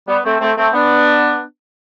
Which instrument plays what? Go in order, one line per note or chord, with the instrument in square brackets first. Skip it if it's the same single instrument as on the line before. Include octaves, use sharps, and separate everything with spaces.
[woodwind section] G3 B3
A3 C4
A3 C4
A3 C4
B3 D4